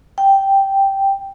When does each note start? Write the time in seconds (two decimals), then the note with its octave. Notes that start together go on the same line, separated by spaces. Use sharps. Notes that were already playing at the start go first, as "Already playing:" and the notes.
0.18 G5